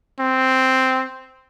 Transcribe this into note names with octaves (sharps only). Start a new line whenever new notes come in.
C4